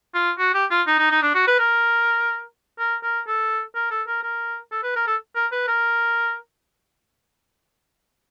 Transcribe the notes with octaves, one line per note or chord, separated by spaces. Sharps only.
F4
F#4
G4
F4
D#4
D#4
D#4
D4
F#4
B4
A#4
A#4
A#4
A4
A#4
A4
A#4
A#4
A4
B4
A#4
A4
A#4
B4
A#4